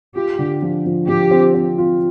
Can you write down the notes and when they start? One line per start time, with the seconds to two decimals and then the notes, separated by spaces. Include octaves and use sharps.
0.16 F4 G4
0.39 D3
0.62 F3
0.86 F3
1.08 F3 G4
1.31 C4
1.54 C4
1.78 F4